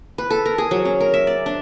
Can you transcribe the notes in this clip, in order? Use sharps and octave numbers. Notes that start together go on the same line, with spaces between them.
B4
A4
A#4
G#4
F#3
C#4
A#4
E5
D5
D4